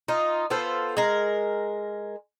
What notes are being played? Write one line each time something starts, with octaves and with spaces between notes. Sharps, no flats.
D#4 F4
B3 F4 A4 C5
G#3 A#4